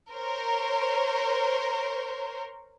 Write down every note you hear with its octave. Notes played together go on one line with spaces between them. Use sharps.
A#4 C5 C#5